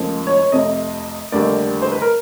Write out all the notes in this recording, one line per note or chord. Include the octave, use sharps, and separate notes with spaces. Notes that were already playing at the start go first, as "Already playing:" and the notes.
Already playing: F1 D#2 C#3 F3 G#3
C#5
C#5
F1 F2 C3 D#5
F1 D#2 D3 G3 D5
C5
B4
A#4